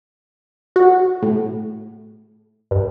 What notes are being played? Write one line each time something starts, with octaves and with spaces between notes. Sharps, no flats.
F#4
A2
G2